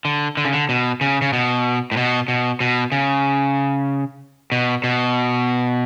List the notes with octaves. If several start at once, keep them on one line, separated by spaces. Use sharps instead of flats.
D3
D3
C#3
D3
B2
C#3
C#3
B2
A2
B2
B2
B2
C#3
B2
B2